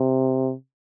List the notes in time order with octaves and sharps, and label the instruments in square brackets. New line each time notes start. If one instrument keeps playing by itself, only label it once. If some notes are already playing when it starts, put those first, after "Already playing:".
Already playing: [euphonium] C3